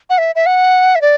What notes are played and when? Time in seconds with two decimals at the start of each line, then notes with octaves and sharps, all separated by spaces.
0.10 F#5
0.18 E5
0.35 E5
0.46 F#5
0.95 E5
1.01 D5